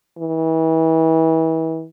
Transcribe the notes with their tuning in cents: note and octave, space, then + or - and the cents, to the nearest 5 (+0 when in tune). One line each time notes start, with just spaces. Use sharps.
E3 -35